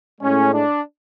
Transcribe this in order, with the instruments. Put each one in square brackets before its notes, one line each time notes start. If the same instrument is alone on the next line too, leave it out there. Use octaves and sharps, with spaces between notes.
[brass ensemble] A2 G#3 C#4
D4